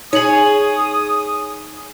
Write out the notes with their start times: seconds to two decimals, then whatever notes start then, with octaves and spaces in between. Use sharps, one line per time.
0.13 D#4 G#4 C#5 D#6 F#7